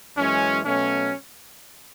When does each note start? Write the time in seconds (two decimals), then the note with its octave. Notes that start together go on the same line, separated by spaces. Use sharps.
0.17 F#2 E3 G#3 C#4
0.64 B2 F#3 A3 C#4